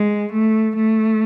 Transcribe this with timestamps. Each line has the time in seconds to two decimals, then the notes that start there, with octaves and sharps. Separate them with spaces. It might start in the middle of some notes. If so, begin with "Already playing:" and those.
Already playing: G#3
0.33 A3
0.76 A3